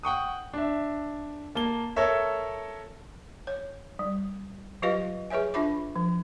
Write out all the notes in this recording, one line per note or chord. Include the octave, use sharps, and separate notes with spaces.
F#5 G5 C#6 D#6
D4 E5
A#3 A5 G7
A4 A#4 C#5 E5
C#5
G3
F#3 F4 G4 B4 D#5 F5
G#4 B4 C#5 E5 G#5
D4 F4 E5 B5 D6
F3